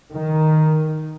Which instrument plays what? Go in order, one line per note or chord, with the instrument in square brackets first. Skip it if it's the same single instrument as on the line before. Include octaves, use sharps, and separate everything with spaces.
[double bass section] D#3